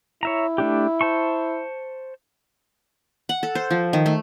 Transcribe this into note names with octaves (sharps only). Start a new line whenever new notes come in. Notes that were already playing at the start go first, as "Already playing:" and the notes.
E4 C#5 E5 A#5
A3 D4 G4
C5 A5 C#6
F#5
A4
C5
F3
D#3
A3